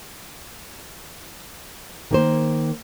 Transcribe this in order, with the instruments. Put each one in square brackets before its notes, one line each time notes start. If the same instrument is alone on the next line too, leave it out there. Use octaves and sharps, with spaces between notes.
[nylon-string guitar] D#3 A#3 C5